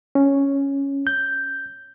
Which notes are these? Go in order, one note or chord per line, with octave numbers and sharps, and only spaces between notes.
C#4
G6